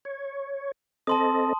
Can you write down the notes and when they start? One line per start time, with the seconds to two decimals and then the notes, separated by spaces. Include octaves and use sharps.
0.05 C#5
1.07 C4 A4 D#5 A5 C6 D#6